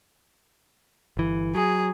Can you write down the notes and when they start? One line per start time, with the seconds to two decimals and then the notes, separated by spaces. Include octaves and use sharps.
1.17 G1 E3
1.55 F#3 G#4